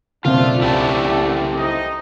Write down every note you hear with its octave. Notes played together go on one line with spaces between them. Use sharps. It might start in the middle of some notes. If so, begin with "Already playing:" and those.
F#1 B2 A3 C4 D4 F4 F5
C2 E4 G4 A4
D#4 C5 D#5